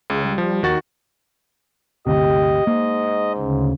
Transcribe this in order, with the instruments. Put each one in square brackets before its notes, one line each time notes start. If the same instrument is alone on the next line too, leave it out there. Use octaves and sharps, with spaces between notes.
[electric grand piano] C#2 [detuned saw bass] C#3
[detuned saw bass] G3
[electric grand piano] F3
[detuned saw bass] D#2 [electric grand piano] D#3 F#4 A6
[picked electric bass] G1 D2 C3 [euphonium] G4 [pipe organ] D#5
[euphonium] G#2 [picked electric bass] A#3
[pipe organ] D2 C#3